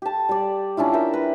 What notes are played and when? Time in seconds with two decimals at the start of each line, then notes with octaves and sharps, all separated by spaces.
0.02 G4 A5
0.29 G3 D5
0.77 C#4 D4 E4 F4
0.93 A#4 E5 G5 C6
1.13 B4